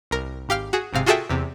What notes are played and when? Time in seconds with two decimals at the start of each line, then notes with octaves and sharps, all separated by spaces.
0.11 C2 A#4
0.49 G#1 G4 F5 F6
0.73 F#4 G#4
0.93 G#1 G#2 C3 F5
1.06 F4 F#4 G#4 A4 E5 G5
1.29 E2 C3